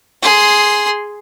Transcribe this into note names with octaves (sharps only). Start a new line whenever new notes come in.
G#4 C6